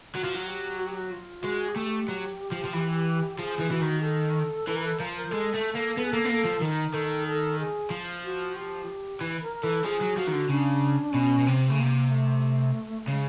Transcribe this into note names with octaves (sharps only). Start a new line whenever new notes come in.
F#3 F#4
F3
F#3
G4
F#4
G4
F#4
F4
G#3 F#4
G#4
A3 G4
F#3
F3
F3
E3
F3 G#4
E3
E3 F#4
D#3
A4
E3 A4
A#4
A4
F3 A#4
A#4
G#3 A4
A3 A4
A#3 A4
B3 A4
G#4
A#3 A4
B3
A#3 A4
F3
D#3 A#4
D#3 A4
A4
G#4
F3
F#4
G4
E3
A#4
E3 A4
F3 G#4
F#3
F3 F#4
D#3
D3
C#3 D4
B2 C#4
B2
C3 C4
C#3 A3
C3 A#3
A3
C#3 G#3